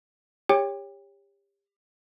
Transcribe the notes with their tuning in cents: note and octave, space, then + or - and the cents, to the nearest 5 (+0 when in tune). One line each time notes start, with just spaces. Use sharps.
G4 +30 C#5 +0 G5 +30